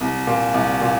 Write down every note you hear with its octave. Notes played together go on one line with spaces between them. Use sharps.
C2
A#2
C2
A#2